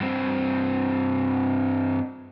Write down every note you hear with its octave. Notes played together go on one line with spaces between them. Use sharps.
G2 C4